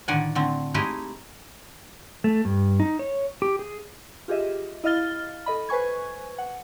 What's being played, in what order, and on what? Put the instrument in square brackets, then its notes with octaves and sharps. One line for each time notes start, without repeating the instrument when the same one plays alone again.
[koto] A2 D3 D#3 D5 F#5 G#5
D3 A3 C4
G#3 A3 D#4 E4 G4 G#4
[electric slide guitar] A3
G2
D#4
C#5
G4
G#4
[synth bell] F4 G4 G#4 D#5 E5
E4 D#5 F5 F6 A6 G7
A4 D#5 B5
B4 C5 G#5 C#6 G#6
F#5